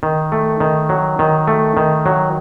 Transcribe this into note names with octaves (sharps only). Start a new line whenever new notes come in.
D#3
A3
D#3
F#3
D#3
A3
D#3
F#3